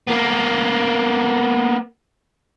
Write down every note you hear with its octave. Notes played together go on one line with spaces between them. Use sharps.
A#3 B3